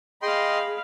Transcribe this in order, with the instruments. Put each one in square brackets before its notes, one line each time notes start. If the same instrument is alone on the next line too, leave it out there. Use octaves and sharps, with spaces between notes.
[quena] G#4 [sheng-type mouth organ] D#5 G5 C6 [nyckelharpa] F5 B5